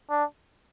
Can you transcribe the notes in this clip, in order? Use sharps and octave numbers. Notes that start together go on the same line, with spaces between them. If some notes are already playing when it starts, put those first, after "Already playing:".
D4